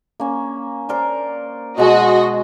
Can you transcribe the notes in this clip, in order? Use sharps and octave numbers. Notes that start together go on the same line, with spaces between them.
A#3 C#4
A#4 C5 D5
B2 G#3 F#4 D#5